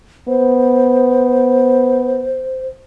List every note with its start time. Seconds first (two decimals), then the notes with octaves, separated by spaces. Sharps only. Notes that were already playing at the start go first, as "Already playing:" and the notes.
0.28 B3 C5